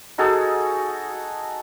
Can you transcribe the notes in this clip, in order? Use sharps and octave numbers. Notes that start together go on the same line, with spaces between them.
D#4 F#4 G#4 A4